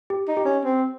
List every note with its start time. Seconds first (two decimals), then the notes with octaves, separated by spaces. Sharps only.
0.10 G4
0.28 D#4
0.37 G4
0.45 C#4
0.64 C4